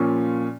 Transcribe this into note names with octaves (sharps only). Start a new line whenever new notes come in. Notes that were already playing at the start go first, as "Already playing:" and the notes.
Already playing: A#2 F3 C#4